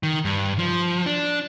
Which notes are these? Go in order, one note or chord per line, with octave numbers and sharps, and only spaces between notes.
D#3
G2
F3
D4